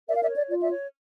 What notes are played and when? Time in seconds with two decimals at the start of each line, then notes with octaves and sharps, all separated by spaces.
0.08 A#4 D5 E5
0.16 F5
0.22 D5 E5
0.29 C#5
0.35 D5
0.49 F4 D5
0.62 D5 E5
0.69 C#5